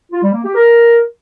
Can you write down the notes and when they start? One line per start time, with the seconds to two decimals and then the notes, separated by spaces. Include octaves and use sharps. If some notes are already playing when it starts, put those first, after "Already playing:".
0.12 F4
0.23 G3
0.34 A#3
0.44 G4
0.55 A#4